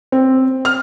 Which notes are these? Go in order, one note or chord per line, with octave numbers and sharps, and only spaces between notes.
C4
F6